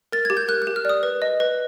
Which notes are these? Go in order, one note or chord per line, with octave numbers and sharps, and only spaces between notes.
A#4 A6
G4 G#6
G6
A#4 F#6
F#6
G4
F6
D5 D#6
B4
D#5
B4